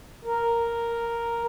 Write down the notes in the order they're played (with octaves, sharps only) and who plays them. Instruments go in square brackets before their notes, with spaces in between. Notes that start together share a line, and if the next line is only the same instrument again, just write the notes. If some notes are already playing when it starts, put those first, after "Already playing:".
[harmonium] A#4